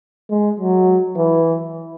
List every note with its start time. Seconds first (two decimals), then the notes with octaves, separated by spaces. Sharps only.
0.30 G#3
0.60 F#3
1.17 E3